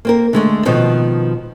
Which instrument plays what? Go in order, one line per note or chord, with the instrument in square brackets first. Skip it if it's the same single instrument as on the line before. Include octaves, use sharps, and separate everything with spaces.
[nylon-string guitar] A#3 C4 A#4
D3 G#3 A3
B2 D#3 F3 B3 C4 F#4